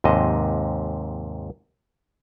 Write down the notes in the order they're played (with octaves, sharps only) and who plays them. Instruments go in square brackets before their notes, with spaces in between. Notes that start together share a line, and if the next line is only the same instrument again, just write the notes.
[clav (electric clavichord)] D#2 G#2 C3 D#5 A5